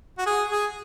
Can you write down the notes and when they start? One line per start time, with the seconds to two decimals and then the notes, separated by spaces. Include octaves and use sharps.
0.18 F#4
0.26 G#4
0.49 G#4